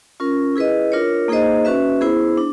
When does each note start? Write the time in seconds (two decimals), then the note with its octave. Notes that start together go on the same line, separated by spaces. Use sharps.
0.20 C#4 F4 A#4
0.56 E4 G#4 B4 D#5
0.92 D4 F4 A#4 C#5
1.28 A#3 D#4 G#4 C5 D#5
1.65 C#4 F#4 B4 E5
2.01 B3 E4 G#4 C5
2.38 D4